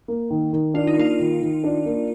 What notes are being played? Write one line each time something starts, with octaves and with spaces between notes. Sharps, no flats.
A#3
D#3
D#3
D4 F4
D#4
A#3 F4
D#3
D#3
D4
A#3